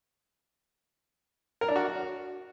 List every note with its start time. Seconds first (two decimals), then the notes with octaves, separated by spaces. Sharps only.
1.61 A#4
1.68 D4
1.76 F#4